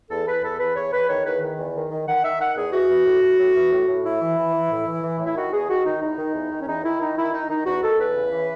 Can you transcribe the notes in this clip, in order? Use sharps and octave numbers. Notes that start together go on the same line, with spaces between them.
E2 A4
E2 B4
E2 A4
E2 B4
E2 C#5
E2 B4
D#3 C#5
E2 B4
D#3
E2
D#3
D#3
D#3 F#5
D#3 E5
D#3 F#5
E2 G#4
E3 F#4
E3
A2
A2
A2
E3
A2
A2
A2 E4
E3
E3
E3
A2
E3
E3
A2
E4
D#3 F#4
E2 G#4
D#3 F#4
D#3 D#4
E2 D#4
D#3
E2
D#3
C#4
E2 D#4
D#3 E4
D#3 D#4
D#3 E4
D#3 D#4
D#3 D#4
E2 F#4
D#3 A4
E2 B4
C#3
E3